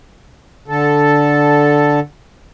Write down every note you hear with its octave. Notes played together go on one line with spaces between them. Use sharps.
D3 A4